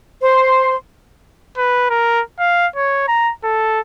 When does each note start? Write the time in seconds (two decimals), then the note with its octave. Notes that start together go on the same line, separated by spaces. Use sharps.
0.23 C5 C6
1.58 B4
1.90 A#4
2.39 F5
2.76 C#5
3.08 A#5
3.44 A4